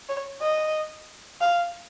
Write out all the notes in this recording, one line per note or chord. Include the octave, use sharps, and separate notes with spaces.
C#5
D#5
F5